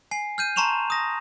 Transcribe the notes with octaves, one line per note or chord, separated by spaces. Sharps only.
G#5 C7
F6 G6 D#7
A5 A#5 C6 C#6 E7 F7
D#6 A#6